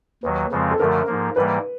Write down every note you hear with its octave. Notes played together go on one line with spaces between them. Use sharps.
D#2 D#3 F#3 B4
F2 C#3 F3 G#3 C4
A4
F#2 D3 F3 A3 A#4
G#2 F3 A#3
G#2 E3 G3 A#3 B4